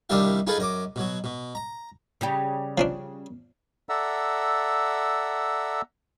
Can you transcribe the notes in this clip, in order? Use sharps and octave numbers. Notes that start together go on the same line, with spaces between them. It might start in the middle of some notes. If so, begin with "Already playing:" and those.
C2 D#3 G3 D4 E5 F5
D#4 F4 G#4 A4 B4
F#2 D#5 D6
B2 F#3
B2
A#5
C#3 G3 G4
F3 C#4 D4
A4 D5 E5 F#5 A#5 E6